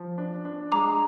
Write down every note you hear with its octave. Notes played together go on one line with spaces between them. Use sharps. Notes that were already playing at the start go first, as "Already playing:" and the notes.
Already playing: F3
D4
D4
G#3 A#5 D6